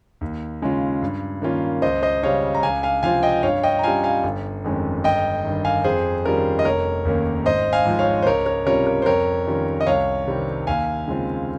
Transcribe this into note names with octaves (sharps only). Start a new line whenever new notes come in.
D#2
C#3 G#3 C#4 F4
G2
D#3 A#3 C#4 F4
C#2 C5 D#5
C5 D#5
C#3 G3 C#5 F5
A#5
C#2 F5 G#5
F5 G#5
C3 F3 C4 F4 F5 G#5
D#5 G5
G2 C#5 F5
D#5 G5
A#5
G3 C#4 F4 F5 G#5
F5 G#5
G1
F2 D#3 G#3 C#4
G1 D#5 G5
G2 D#3
F5 G#5
F2 G#4 C5
D#3 G3 C#4 F4 A#4
D#5
F1 A#4 C#5
D#2 D#3 A#3 C#4
G#1 C5 D#5
F5 G#5
G#2 F3
C#5 F5
C5
C#2 A#4 C#5
A#4 C#5
C3 G3 C#4 F4 A#4 C#5
A#4
C5
F2 A#4 C#5
D#3 G3 C#4 F4
D#5
C2 C#5 F5
C3 D#3 G3 C4
D#2 F5 G#5
C#3 G#3 C4 F4